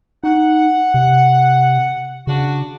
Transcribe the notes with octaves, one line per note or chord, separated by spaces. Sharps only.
D#4 F#5
C3
C#3 D4 F#4